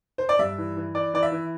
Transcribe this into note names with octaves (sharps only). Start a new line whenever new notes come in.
C5
D5
G2 E5
E3
E3
E3 D5
E3 D5
E5
E3